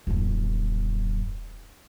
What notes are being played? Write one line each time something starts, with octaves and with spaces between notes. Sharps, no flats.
D#1 F#2